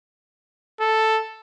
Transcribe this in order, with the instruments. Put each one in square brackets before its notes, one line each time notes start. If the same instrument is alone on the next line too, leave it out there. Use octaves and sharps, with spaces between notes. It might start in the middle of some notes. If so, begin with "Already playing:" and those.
[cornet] A4